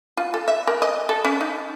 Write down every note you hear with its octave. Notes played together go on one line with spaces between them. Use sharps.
F4
A4
E5
A#4
D#5
A4
C#4
D#4